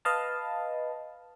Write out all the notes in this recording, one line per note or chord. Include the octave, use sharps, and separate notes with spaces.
B4 D#5 F5 A5